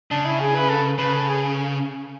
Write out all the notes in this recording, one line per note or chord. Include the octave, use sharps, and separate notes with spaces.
C#3 D4
E4
G#4
B4
A4
C#3 B4
A4
G#4